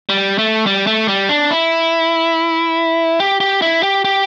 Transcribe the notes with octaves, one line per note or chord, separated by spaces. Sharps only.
G3
A3
G3
A3
G3
D4
E4
G4
G4
E4
G4
G4